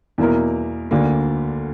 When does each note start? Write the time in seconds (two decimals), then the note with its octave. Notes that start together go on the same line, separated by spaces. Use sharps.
0.18 E2 B2 A#3 E4 A#4
0.91 D2 D3 A#3 D4